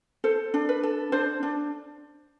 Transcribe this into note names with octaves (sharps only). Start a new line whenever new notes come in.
A4 C5
D4
B4
A4
D4 C5
D4